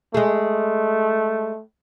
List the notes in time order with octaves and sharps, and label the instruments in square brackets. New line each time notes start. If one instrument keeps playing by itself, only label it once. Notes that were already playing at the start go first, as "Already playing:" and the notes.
[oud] G#3 G#4 [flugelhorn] A3